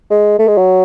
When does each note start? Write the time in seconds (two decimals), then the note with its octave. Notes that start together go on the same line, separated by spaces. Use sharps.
0.10 G#3
0.39 A3
0.48 G#3
0.57 F#3